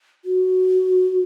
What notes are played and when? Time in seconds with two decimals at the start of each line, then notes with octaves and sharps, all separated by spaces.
0.25 F#4